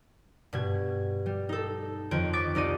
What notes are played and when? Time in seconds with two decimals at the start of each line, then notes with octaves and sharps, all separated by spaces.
0.53 G2 B2 G#6
1.26 G3
1.49 D#4 A4
2.11 F2 D#3 C4 C#5 D7
2.33 C#6 D6 A6 B6 D7
2.55 C2 D#4 D5 D#7